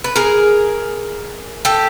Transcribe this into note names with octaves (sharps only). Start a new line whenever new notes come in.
B4
G#4 A#4
G4 A4